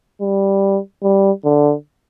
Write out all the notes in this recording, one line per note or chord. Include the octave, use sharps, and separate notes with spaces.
G3
G3
D3